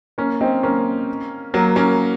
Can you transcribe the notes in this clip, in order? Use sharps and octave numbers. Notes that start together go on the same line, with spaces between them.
A#3 C#4
C4 D#4
A#3 C#4
F#3 A#3
A#3 C#4